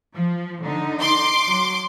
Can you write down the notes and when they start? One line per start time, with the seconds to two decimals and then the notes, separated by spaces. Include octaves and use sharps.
0.15 F3
0.64 D3 D#4
1.00 C6 D6
1.48 F#3